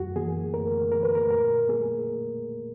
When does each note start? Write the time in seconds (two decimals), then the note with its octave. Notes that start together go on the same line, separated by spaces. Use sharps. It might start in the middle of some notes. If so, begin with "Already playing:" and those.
Already playing: F#2 F#4
0.16 E3 A#3 G#4
0.54 F#2 A#4
0.92 E3 A#3 A#4
1.03 B4
1.15 A#4
1.31 A#2 A#4
1.69 A#3 G#4